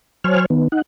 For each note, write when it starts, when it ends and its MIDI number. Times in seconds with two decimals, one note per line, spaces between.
0.24 0.46 54
0.24 0.46 72
0.24 0.46 73
0.24 0.46 80
0.24 0.46 89
0.50 0.68 51
0.50 0.68 59
0.72 0.82 63
0.72 0.82 78